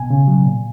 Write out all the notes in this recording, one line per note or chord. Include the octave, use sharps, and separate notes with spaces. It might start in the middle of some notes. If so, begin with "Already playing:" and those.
Already playing: B2 G#5
C#3
F#3
A#2